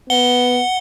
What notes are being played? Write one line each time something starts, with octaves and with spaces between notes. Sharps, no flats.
B3 F#5 G7